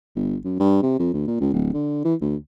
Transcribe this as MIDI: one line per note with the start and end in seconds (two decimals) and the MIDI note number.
0.16 0.36 31
0.45 0.59 42
0.60 0.81 43
0.83 0.98 48
0.99 1.13 41
1.14 1.25 38
1.28 1.40 46
1.40 1.49 37
1.53 1.70 26
1.74 1.99 50
2.05 2.15 52
2.21 2.36 38